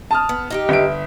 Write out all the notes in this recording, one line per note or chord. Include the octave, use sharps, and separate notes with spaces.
A5 D#6 F6
B3
D#4 F#4 G4
G1 E5 D7